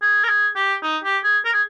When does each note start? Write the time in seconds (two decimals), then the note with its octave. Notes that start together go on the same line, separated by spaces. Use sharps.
0.02 G#4
0.24 A#4
0.28 G#4
0.55 G4
0.83 D#4
1.04 G4
1.24 G#4
1.45 A#4
1.53 G#4